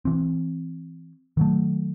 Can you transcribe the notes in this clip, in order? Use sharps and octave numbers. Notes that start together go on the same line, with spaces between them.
E3 C4
D#3 F#3 A3